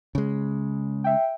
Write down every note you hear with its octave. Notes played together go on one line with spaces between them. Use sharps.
C#3 G#3
E5 G5